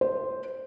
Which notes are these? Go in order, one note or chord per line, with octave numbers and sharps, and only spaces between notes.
C5